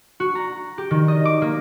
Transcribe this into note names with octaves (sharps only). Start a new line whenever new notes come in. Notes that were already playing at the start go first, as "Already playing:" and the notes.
F#4
A#5
G4
D#3
D#5
D6
A#3